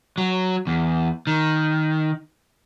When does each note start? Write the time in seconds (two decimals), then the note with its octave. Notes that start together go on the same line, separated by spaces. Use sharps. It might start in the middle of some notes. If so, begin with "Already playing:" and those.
0.18 F#3
0.67 E2
1.27 D#3